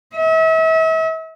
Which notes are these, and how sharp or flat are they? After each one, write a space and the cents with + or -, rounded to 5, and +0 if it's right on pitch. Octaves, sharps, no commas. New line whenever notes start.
E5 -40